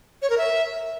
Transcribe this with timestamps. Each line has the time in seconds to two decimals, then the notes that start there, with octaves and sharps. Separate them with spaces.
0.22 C#5
0.30 A#4
0.38 E5